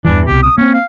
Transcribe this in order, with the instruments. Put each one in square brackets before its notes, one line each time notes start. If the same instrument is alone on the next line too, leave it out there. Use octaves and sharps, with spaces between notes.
[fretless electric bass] E2 G2 E3 [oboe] D4
[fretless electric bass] C2 B2 [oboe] G4
[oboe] D#6
[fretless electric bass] A#3 C4 [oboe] C#4
[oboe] F5